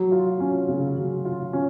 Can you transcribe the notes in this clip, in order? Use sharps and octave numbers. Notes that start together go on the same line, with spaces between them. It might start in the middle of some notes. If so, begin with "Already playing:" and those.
Already playing: F#3
F4
C#4
C#3
F#3
F4
C#4